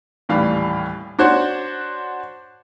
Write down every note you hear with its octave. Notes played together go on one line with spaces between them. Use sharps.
D#1 A2 E3 G3 F5
D4 F#4 C5 C#5 F#5